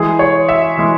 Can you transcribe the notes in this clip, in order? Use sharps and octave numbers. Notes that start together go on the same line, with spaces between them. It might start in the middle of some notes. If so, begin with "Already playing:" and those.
Already playing: E3 G#3 E4 G#4
C#5
E5
E3 G#3 E4